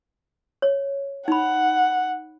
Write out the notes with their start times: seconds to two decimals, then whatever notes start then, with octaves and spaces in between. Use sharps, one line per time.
0.62 C#5
1.28 D#4 F#5 B5